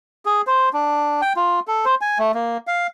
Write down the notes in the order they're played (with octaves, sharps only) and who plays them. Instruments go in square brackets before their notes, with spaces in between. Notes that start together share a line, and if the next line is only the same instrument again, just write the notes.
[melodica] G#4
C5
D4
G5
F4
A4
C5
G#5
A3
A#3
F5